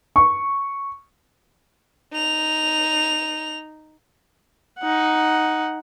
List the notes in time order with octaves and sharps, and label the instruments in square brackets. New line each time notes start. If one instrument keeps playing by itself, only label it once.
[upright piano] C#6
[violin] D#4 F7
[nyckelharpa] D#4 F#5